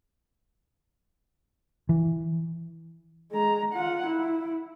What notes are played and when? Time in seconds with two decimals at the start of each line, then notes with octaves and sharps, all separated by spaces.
1.89 E3
3.31 G#3 A#5
3.73 F4 F#5
4.06 E4